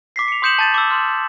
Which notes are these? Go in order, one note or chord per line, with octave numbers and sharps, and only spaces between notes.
D6 B6 C7
C#7 F7
C6 D#6 G6 C#7 E7 F#7
A5 A6 E7
D6 E6
C6 F6